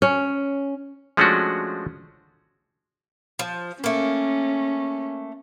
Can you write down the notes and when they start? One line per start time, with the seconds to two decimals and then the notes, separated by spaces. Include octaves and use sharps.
0.02 C#4
1.17 F3 G#3 A3 C#4 D4 F#4
3.39 F3
3.84 A3 A#3 C#4